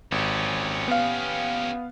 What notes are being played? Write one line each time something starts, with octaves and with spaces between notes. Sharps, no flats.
G#1 C#4 G4
B3 F5